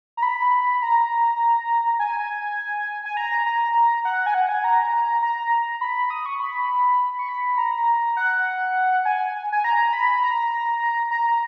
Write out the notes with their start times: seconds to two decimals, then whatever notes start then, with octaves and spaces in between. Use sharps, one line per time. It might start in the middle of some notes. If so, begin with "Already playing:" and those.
0.17 A#5
0.22 B5
0.82 A#5
1.99 G#5
3.05 G#5
3.17 A#5
3.46 A#5
4.05 F#5
4.26 G#5
4.34 F#5
4.49 G#5
4.64 A#5
5.22 A#5
5.81 B5
6.10 D#6
6.26 C#6
6.40 B5
7.19 C#6
7.29 B5
7.58 A#5
8.17 F#5
9.05 G#5
9.52 G#5
9.64 A#5
9.93 B5
10.23 A#5
11.11 A#5